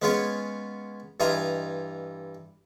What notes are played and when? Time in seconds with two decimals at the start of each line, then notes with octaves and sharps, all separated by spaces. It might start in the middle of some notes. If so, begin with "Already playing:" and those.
0.02 G#3 B3 C#4 F4 G#4 C#5
1.20 G2 E3 F4 D#5 G#5 A#5